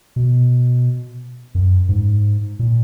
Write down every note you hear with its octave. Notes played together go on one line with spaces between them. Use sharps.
B2
F#2
G#2
A#2